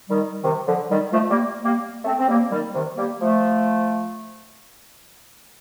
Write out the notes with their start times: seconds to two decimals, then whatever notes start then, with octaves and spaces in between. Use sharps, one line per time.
0.09 D#3 G3
0.43 C3 D#3
0.66 D3 F3
0.90 D#3 G3
1.12 F3 A3
1.30 G3 A#3
1.64 G3 A#3
2.05 A3 C4
2.19 C4
2.28 G3 A#3
2.51 D#3 G3
2.74 C3 D#3
2.97 G3 A#3
3.20 F3 A3